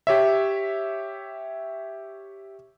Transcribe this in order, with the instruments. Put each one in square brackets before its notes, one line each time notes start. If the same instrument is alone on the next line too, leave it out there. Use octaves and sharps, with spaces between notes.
[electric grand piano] G4 C#5 E5